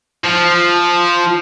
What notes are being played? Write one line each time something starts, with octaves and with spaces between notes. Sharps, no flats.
F3